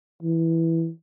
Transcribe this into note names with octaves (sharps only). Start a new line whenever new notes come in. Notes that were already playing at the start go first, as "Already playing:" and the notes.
E3